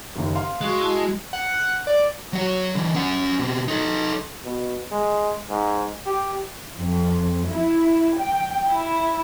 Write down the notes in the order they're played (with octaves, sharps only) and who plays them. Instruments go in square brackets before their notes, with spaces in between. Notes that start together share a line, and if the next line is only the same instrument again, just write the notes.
[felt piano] F#1 D#2
F5 C6
[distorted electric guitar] G#3 [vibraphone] F#4 C#6
[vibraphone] E4 F#4 A5
[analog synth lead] F#5
D5
[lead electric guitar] F#3 C#5
D3 E3
C#4 F#5
B2 C4
D#4 A4
[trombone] B2
G#3
G#2
G4
[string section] F2
E4
G5
E4